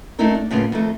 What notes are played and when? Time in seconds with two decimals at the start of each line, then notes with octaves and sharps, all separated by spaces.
0.19 A3 C4 C#4 D#4 E4 A#4
0.35 D4
0.51 A2 C#3 A#3 B3 F4
0.72 F2 D#3 A3